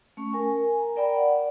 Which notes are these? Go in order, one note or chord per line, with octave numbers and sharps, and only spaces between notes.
A3 C#4 C#6
A#4 G#5
A#5
A#4 D5 G5 B5
D5 F#5
D5